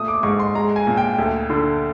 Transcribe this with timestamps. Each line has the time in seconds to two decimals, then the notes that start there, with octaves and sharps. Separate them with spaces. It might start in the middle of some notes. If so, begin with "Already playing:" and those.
Already playing: A#2 A3 D#6
0.08 D6
0.23 G#2 C#6
0.40 C6
0.55 G#3 A#5
0.76 G#5
0.87 A#2
0.97 G5
1.19 D2
1.50 D3